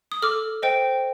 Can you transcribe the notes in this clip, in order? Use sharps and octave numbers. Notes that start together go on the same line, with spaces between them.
D#6
A4 D6 F6
C5 D#5 G5